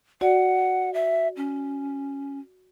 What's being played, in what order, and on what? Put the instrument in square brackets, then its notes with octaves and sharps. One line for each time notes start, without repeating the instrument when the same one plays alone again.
[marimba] F#4 D5 [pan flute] F#5
[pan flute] E5
C#4